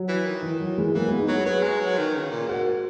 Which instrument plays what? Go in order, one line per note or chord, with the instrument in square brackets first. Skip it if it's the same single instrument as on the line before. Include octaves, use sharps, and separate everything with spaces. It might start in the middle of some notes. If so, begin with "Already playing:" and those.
Already playing: [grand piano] F#3
[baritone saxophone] E3
D#3
[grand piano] E3
F#3
E3 G#3
[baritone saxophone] E3 [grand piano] F#3 A#3
[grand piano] G#3 B3
B3 D#4
[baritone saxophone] F#3
[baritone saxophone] F#3 [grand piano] G#4 B4
[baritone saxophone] G#3
F#3
D#3
C#3
A#2
[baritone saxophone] G#2 [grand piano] F#4 A#4